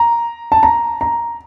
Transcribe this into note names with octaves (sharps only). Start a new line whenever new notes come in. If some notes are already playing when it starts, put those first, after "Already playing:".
Already playing: A#5
A5
A#5
A#5